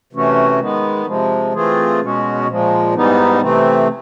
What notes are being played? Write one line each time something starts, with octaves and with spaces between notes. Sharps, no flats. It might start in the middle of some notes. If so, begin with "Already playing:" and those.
C3 E3 A3 C#4 F#4
D#3 G#3 B3
C3 F3 G#3
E3 A3 C4 F4 G#4
B2 G#3 C#4 F#4
A#2 F3 G#3
G#2 E3 G3 B3 D#4
C3 E3 A3 C4